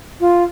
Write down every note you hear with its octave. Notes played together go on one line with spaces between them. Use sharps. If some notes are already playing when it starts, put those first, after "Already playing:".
F4